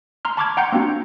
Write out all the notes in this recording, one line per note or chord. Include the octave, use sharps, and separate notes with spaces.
A#5 C6 F6
A5 B5 C#6 D6 F6 G#6
F#5 G5 A#5 C6 G6 C#7
A#3 C4 D4 F#4